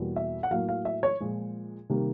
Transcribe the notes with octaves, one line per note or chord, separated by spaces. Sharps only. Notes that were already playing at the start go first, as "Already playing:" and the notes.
Already playing: E2 B2 G3 A#3
E5
F#5
A2 F#3 A#3 F5
F5
E5
C#5
A#2 F3 G#3
C3 D#3 G3 A#3